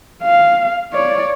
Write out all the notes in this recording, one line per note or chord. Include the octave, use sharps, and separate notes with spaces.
F5
C#5 D5